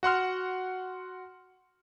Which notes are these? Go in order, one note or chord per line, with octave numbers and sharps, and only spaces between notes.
F#4 F#5 C6 F6